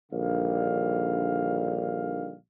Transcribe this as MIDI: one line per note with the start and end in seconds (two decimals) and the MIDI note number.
0.12 2.34 34
0.12 2.34 50
0.12 2.34 51
0.12 2.34 55
0.12 2.34 77